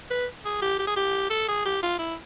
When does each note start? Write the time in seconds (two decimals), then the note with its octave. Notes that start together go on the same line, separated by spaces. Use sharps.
0.11 B4
0.45 G#4
0.62 G4
0.79 G4
0.87 G#4
0.96 G4
1.30 A4
1.49 G#4
1.65 G4
1.83 F4
1.99 E4